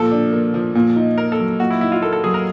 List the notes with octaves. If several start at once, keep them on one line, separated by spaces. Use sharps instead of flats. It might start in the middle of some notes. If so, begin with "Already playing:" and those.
Already playing: A#2 F3 A4
D4
A#3
F3
A#2
D#4
A#3 A#4
A4
F#3
A#2 F#4
E4
D#4 E4
F4
A#3 A4
A4
F#3 G#4
A#4